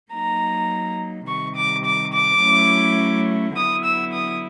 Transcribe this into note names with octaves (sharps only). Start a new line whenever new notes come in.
F#3 A#3 D#4 A#5
C3 D#3 G3 C#6
D6
D6
D6
F#3 A3 C#4 E4
D3 F#3 B3 E4 D#6
E6
D#6